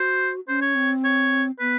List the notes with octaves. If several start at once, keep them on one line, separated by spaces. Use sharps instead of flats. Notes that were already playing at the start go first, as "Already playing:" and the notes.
Already playing: F#4 C5
C#4 C5
C#5
C4
C#5
B3 B4